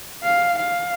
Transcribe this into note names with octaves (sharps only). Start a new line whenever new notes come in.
F5
F5